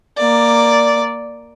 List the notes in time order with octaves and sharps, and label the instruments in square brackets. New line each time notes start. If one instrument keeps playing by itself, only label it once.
[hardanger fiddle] A#3 D5